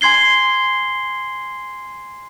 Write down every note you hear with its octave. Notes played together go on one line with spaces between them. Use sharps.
G#5 C6 G#6 C7 G7